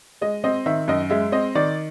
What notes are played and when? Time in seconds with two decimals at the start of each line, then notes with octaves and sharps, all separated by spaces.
0.21 G#3 D#5
0.44 C4 D#5
0.66 D#3 E5
0.88 F#2 D#5
1.10 G#3 E5
1.32 C4 D#5
1.55 D#3 D5